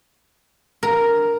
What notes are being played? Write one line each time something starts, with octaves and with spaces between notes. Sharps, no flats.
A#4